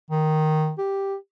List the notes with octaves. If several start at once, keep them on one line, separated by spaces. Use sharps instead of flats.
D#3
G4